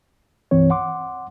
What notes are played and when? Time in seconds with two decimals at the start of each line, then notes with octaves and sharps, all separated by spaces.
0.51 C2 G2 E3 C4 C#5
0.70 F#5 C6 D6